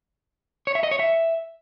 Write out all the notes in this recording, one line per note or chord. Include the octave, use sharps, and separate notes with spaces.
C#5
E5
D#5
C#5
E5